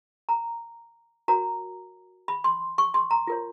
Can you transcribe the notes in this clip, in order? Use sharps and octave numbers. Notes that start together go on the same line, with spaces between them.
A#5
F#4 A#4 C#5 A#5
B5
C6
C#6
C6
A#5
F4 A#4 C#5